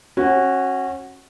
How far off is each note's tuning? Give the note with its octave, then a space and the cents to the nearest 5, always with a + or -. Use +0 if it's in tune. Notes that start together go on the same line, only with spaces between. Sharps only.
C#4 -30 F#4 +0